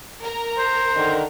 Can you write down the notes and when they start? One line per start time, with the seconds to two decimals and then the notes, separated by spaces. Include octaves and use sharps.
0.22 A#4 A#5
0.58 C5
0.95 D3 D#3